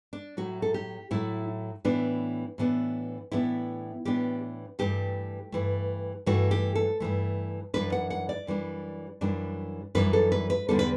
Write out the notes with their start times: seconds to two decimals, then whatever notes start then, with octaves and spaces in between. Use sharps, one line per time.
0.13 D4
0.37 A2 F#3 A3 F#4
0.62 A4
0.74 G4
1.11 A2 F#3 A3 E4
1.85 A2 E3 B3 D4
2.58 A2 E3 B3 D4
3.32 A2 E3 B3 D4 E4
4.05 A2 E3 B3 D4 G4
4.79 G2 E3 A3 G4
5.52 G2 E3 A3
6.26 G2 E3 A3 F#4
6.51 G4
6.75 A4
7.00 G2 E3 A3
7.74 F#2 E3 G3 D4 B4
7.92 F#5
8.10 F#5
8.29 D5
8.47 F#2 E3 G3 D4
9.21 F#2 E3 G3 D4
9.95 F#2 E3 G3 D4 B4
10.13 A4
10.32 B4
10.50 B4
10.69 E2 D3 G3 B3 D4 A4
10.79 B4